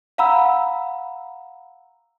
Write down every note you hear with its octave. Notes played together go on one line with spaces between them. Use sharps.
F5 F#5 A#5 B5 E6